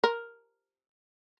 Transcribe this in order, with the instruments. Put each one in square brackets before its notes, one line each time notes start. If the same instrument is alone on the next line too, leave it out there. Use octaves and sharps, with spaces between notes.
[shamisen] A#4